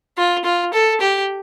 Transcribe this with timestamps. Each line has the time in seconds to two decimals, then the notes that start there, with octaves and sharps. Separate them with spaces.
0.18 F4
0.44 F4
0.74 A4
1.01 G4